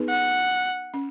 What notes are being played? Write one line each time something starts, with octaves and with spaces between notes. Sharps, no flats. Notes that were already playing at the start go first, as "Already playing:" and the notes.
Already playing: B3 D#4 G#4 B4
F#5
C#4